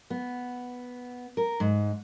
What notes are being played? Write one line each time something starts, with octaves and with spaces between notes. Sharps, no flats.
B3
A#4
G#2